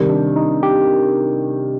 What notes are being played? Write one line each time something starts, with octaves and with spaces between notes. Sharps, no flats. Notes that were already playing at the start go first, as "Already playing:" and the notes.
Already playing: C3 D#3 G3
D4
D#4
G4